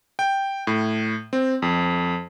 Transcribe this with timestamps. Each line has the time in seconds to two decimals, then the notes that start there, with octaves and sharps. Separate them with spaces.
0.19 G5
0.67 A2
1.33 C4
1.62 F2